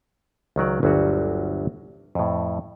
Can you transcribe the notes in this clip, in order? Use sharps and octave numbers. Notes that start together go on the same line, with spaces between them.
C#2 D#3 F#3 D5
G1 D2 F#3 G3 F#4
F2 A2